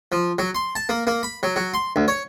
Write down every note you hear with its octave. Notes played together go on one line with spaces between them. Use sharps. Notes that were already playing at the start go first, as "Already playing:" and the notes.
F3
F#3
C6
A5
A#3
A#3
B5
F#3
F#3
C6
D2
C#5